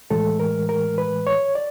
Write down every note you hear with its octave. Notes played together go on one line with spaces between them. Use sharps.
A2 E3 G#3 A4
A#4
A#4
B4
C#5
D5